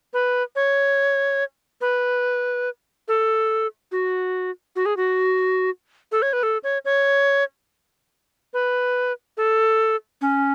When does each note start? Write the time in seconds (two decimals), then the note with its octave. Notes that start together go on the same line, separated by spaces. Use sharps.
0.13 B4
0.56 C#5
1.81 B4
3.08 A4
3.92 F#4
4.76 F#4
4.86 G#4
4.97 F#4
6.12 A4
6.22 C#5
6.33 B4
6.43 A4
6.64 C#5
6.85 C#5
8.54 B4
9.37 A4
10.21 C#4